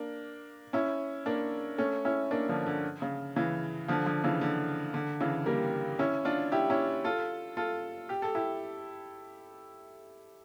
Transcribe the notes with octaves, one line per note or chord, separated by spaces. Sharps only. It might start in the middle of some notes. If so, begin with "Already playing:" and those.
Already playing: A#3 D4
C#4 E4
A#3 D4
A3 C#4
C#4 E4
A#3 D4
D3 F3
D3
C#3
C#3 E3
D3 F3
D3 F3
C#3 E3
D3
D3
C#3 E3
G3 A#3
C#4 E4
D4 F4
E4 G4
C#4 E4
F4 A4
F4 A4
G4
A4
E4 G4